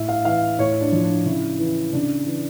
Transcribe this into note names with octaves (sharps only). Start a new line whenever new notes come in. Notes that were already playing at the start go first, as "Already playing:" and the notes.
Already playing: A2 E5
F5
E3 F5
A2 C#5
D4
F3
D4
C#3 E4
E3
C#3 D4
E3